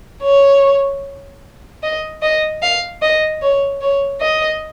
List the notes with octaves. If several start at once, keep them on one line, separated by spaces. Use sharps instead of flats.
C#5
D#5
D#5
F5
D#5
C#5
C#5
D#5